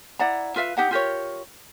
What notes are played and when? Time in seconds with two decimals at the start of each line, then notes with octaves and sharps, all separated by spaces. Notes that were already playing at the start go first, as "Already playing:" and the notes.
0.19 E4 D5 F#5 A#5
0.56 F4 B4 E5 F5
0.77 D#4 G4 F#5 A#5
0.91 F4 G4 A#4 C#5